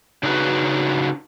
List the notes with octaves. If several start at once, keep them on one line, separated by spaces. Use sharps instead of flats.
C#3 D4 D#4 F#4 A4 B4